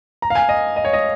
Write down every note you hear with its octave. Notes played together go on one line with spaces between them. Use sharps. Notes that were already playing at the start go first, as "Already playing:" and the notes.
A#5
F5
G#5
D#5
D#5
C#5
D#5